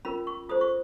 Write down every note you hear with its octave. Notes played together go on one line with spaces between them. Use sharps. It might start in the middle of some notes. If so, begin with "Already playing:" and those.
C#4 F4 A#4 B5
C#6
F4 A4 C5 D#6
C#6